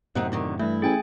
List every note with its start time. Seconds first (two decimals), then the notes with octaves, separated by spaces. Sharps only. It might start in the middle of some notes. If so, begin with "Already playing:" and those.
0.15 F#2 A2 C3 C4 D#4 F#5
0.32 D2 D3 D#3
0.59 G2 E3 A3 E4
0.82 A1 G#4 G5 G#5